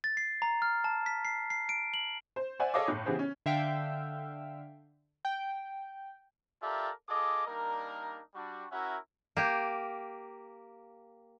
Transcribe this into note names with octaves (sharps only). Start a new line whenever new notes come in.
A6
C7
A#5
F6
A5
B6
C7
C7
D7
F#7
C5
C5 D5 E5 F#5 G#5
G#4 A4 C#5 D#5 F5 D6
G1 A2
C#3 E3 B3 G4 G#4 C5
C#4
D3 E5 F5 G5
G5
F4 G4 A4 A#4 D5 E5
F4 G#4 A4 D#5 D6
G3 A#3 D4 D#4 A#4
G3 D4 F#4
C#4 E4 F#4 A#4 E5 F#5
A#3 G4